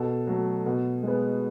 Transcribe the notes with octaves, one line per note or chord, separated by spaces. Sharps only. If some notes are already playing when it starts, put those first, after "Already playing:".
Already playing: B2 A4
F#3 A3
B2
G#3 B3